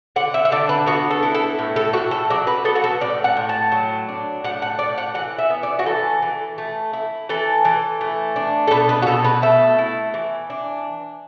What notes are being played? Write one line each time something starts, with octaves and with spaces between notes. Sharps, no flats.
D3 F#5
E5
E5
D3 D5
B4
B3 F#4
A4
E4
A4
A2
A4
A2 F#4
A4
F#3 D5
B4
B3 A4
F#4
A4
A2 D5
F#5
A2
A5
F#3
D4
A2 F#5
F#5
A2 D5
F#5
E3 F#5
E5
B3
D5
F#4
E3 A4
E3
A3
E4
E3 A4
E3
A3
D4
A4
B2 B4
B4
F#4
B2 A4
B4
A3 E5
E4
E3
D4